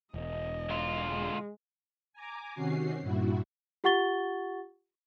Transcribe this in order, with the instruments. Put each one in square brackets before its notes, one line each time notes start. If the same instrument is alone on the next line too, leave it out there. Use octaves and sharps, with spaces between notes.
[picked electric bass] E1 [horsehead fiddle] D#5
[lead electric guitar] D3 F4
[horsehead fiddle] G#3
[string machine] G#5 A#5 D6
C3 D#3 C#4 F#4 C7
G2 A#2 E4 F#4
[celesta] F4 G4 F#5 C#6 A6 G7